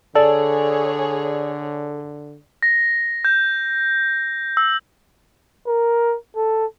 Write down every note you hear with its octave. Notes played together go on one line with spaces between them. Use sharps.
D3 G#4 A4 C#5 D5
A#6
G6
E6
A#4
A4